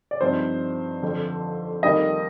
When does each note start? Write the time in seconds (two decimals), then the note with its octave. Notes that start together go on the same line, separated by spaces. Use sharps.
0.11 D5
0.21 G2 F3 C4 D#4 C5
1.02 F2 D3 F3
1.83 F2 D#3 G3 A#3 D#5